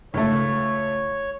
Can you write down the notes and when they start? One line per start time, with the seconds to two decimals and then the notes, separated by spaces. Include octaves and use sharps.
0.14 C#2 A3 C#5